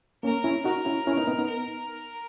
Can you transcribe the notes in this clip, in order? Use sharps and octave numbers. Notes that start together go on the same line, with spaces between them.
A#3 C#4 A#4
C#4 E4
D#4 F#4 A#4
C#4 E4
C#4 E4
B3 D#4
B3 D#4
B3 D#4
A#4